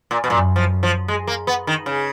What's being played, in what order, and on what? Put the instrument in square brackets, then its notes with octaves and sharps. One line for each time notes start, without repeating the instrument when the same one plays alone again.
[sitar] A#2
B2
[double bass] F#2 [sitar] A#2
[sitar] F3
F3
G#3
A#3
B3
D#3
C#3